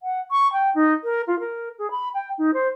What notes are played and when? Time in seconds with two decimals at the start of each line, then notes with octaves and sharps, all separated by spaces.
0.02 F#5
0.31 C#6
0.53 G5
0.74 D#4
1.04 A#4
1.27 F4
1.39 A#4
1.78 G#4
1.90 B5
2.14 G5
2.38 D#4
2.53 C5